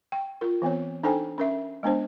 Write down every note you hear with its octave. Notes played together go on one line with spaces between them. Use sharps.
G5
F4 A#4
E3 B3 C4 C#5
D4 D#4 A4 C5 G5 G#5
C#4 A#4 E5
G#3 B3 D4 C5